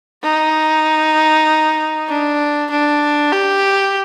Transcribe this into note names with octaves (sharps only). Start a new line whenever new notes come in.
D#4
D4
D4
G4